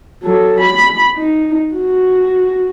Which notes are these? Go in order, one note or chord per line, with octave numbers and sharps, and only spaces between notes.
F#3 A4
B5
D#4
F#4